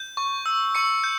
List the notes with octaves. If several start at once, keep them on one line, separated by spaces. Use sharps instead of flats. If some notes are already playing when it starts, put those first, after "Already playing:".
Already playing: G6
C#6
E6
C#6 C#7
G6